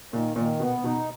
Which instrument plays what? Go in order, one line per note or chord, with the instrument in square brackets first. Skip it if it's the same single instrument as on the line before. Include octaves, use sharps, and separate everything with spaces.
[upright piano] A#2 [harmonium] D#3
[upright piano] A#2 [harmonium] D#3
[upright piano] B2 [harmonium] B3
[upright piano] B2 [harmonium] D#4